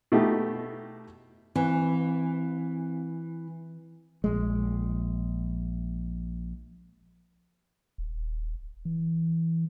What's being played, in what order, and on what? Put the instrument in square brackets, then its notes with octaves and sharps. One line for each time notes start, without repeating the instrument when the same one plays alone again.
[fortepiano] B2 A3 D#4 G4
[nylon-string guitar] E3 [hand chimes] C4
[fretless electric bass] A#1 G#3
[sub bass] D#1
E3